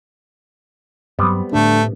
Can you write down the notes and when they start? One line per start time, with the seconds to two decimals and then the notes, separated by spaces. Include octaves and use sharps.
1.19 G2 F#3 G3 B3 C4
1.52 A2 D3 A3 D4